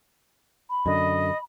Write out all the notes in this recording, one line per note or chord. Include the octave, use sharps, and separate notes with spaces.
B5
F#2 D3 D#5